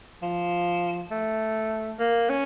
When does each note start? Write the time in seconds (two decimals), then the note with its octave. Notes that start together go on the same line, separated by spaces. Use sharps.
0.22 F3
1.11 A3
1.99 A#3
2.29 C#4